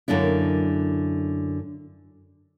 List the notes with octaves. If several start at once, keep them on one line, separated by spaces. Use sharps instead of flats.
F#2 D3 A#3 D4 E4